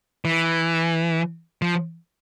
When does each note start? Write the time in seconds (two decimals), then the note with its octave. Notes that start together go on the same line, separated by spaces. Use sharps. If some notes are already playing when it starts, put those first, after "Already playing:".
0.25 E3
1.62 F3